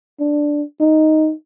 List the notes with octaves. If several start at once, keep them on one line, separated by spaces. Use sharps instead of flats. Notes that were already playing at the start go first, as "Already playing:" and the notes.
D4
D#4